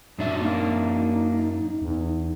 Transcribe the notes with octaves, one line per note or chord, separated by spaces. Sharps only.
F#2 D4 D#4 E5
A#3 D#4
E2